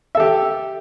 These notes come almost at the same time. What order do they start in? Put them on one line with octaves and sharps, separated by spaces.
E5 A4 G4